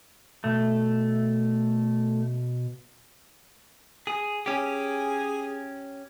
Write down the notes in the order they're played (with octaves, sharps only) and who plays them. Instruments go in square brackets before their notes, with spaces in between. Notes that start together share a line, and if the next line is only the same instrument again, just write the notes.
[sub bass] B2 [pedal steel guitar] A3
[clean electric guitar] G#4
[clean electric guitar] C#4 G4 [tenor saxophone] G#4